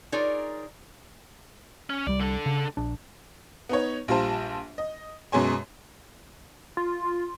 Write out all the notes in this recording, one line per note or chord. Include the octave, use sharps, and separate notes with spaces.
D#4 F4 G#4 A#4 C#5 D5
C#4
C2 G3 D5
D3 A4
C#3
A#1 D4
B3 D#4 C#5
A#1 G3 F4 C5 A5
D#5
F#2 B2 G#3 C#4 G#5 C6
F4